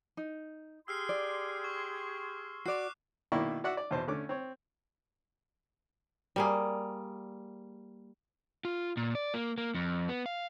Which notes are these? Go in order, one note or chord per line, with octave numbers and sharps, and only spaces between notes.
D#4
G4 G#4 C6 E6 F6 C7
D5
C#6
F#4 D5 D6 F#6 C7
B2 D#3 A#3 E4 D5 C#6
F#4 D5 E5 F#5
D5
E2 B2 C5 A5
D3 A3 C#4 D6
C4 C#5
G3 A#3 G#4
F4
A#2
D5
A#3
A#3
F2
B3
F5